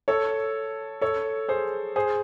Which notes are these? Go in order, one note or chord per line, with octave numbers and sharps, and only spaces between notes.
A4 C#5
A4 C#5
G#4 C5
G#4 C5